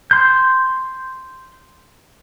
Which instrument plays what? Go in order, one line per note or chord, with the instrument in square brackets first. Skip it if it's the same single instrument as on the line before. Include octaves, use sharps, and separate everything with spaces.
[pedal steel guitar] C6 G6